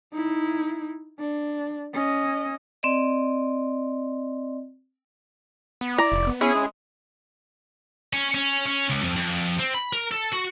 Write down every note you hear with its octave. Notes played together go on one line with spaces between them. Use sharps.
D#4 E4
D4
C#4 D#5
C4 D5 D#5
B3
E4 D5 A#5
F1
B3
C#4 E4 G#4
G#3 C#4
C#4
C#4
C#4
C#2
F2
F2
C4
B5
A#4
A4
F#4